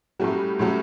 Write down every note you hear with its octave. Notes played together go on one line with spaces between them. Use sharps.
A2 F#3 G3 A3 C#4 F#4
A2 F#3 A3 C#4 F#4